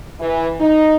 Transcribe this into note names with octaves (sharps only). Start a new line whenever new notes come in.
E3
D#4